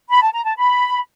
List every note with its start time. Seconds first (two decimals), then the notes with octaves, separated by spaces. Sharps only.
0.10 B5
0.21 A5
0.33 A#5
0.45 A5
0.56 B5